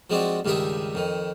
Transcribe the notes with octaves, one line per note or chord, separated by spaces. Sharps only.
F3 G#3 C4 D4 F#4
C#2 G2 D#3 G4 G#4 E5
F2 D#3